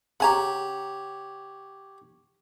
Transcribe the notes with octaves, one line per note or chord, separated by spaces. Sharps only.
C#3 G4 C#5 F#5 G#5 A#5